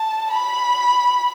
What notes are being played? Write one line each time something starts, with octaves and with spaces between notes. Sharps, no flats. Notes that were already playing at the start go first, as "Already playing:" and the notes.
Already playing: A5
B5